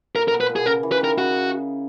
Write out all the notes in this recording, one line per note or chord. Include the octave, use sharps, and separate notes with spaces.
A#2 A#4
A#4
B2
B4
A#2
B2 G#4
C#3 A#4
E3
B4
D#3 A#4
C#3 F#4